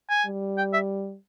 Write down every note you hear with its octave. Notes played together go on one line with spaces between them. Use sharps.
G#5
G3
G5
E5